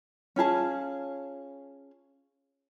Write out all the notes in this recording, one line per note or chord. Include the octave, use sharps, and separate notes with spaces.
C#4 F4 G#4 A5